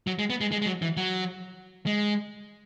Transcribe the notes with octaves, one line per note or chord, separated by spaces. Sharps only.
F#3
G#3
B3
G#3
G#3
G#3
F#3
E3
F#3
G#3